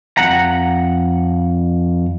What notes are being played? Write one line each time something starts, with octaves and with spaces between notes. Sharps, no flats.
F2 F#5 A#5